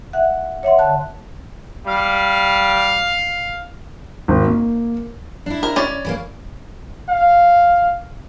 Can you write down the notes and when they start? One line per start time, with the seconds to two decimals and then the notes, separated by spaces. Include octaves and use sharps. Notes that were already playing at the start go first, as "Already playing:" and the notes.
0.13 E5 F#5 F#6
0.63 C#5 E5 F#5 C6
0.78 D3 A5 F#6
1.87 G3 F5
4.28 G#1
4.47 A#3
5.46 D4 E4
5.63 A#4
5.76 C#4 D5
6.05 E3 A3 A#3
7.09 F5